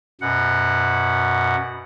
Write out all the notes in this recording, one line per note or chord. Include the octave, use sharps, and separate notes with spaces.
F#2 B2 F#5